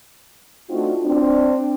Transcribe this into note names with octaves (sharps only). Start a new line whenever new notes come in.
A3 C4 D4 D#4 F4 F#4
C4 D4